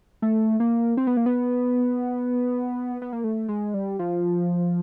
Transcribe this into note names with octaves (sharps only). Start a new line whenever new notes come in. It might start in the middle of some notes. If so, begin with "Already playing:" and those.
A3
A#3
C4
B3
A#3
B3
B3
A#3
A3
G#3
G3
F3